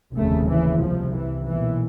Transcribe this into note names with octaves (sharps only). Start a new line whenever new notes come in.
F1 D#2 C#3 A3
E3
C2 C3 F3
E3
B1 A#2 E3